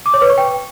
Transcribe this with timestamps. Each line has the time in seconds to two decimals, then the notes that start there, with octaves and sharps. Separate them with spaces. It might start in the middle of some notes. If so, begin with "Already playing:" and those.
0.06 D6
0.14 C#5
0.22 B4
0.30 C#6
0.38 G5